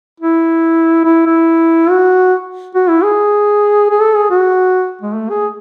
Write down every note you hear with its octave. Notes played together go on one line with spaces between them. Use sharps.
E4
E4
E4
F#4
F#4
E4
G#4
G#4
A4
G#4
F#4
G#3
A3
G#4